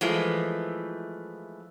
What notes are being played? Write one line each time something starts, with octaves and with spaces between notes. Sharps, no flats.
E3 F3 G#3 A3